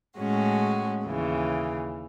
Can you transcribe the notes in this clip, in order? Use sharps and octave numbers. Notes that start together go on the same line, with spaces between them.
A2 G#3 C#4 F#4
D#2 C#3 E3